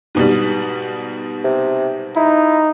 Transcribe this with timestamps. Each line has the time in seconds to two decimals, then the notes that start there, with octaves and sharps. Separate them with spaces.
0.15 G#2 B2 G3
1.44 C3
2.16 D#4 E4